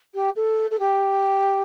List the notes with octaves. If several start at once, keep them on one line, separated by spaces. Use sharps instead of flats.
G4
A4
A4
G4